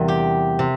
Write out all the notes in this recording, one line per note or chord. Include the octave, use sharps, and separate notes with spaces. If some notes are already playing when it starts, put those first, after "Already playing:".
Already playing: E2 C3 G3 A#4
G4
C3